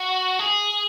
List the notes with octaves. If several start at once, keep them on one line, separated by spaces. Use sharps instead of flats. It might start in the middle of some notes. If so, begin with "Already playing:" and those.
Already playing: F#4
G#4